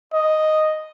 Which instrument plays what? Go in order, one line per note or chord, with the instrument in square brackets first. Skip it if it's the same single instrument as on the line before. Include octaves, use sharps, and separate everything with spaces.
[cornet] D#5